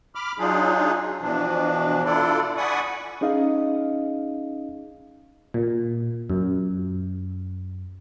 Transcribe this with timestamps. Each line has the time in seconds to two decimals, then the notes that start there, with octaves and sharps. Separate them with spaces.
0.15 B5 D6 F6
0.39 F#3 D4 D#4 F4 G#4
1.21 B2 E3 F3 D4
2.05 D4 E4 F4 A4 D5
2.57 D5 F#5 G#5 B5 C#6 D#6
3.21 C#4 D#4 G#4 D#5 F5
5.54 A#2
6.30 F#2